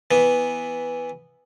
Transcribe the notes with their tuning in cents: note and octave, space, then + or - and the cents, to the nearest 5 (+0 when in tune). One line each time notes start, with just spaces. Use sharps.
E3 +0 B3 +0